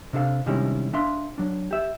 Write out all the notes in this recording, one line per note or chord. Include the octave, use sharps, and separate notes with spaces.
C3 D4 A4 F5
C3 D#3 G3 G#3 C#4 E4
D4 E5 F5 C6
F#3 D4
G4 E5